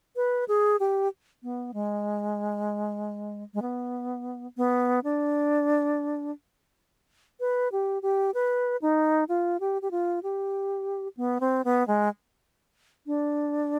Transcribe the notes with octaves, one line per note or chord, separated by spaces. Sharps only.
B4
G#4
G4
B3
G#3
G#3
B3
B3
D4
B4
G4
G4
B4
D#4
F4
G4
G4
F4
G4
B3
C4
B3
G#3
D4